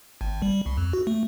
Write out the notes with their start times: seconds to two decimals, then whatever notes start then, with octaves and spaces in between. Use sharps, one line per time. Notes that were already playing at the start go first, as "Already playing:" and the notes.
0.21 G#1
0.42 G3
0.66 C2
0.77 F2
0.93 F#4
1.07 A3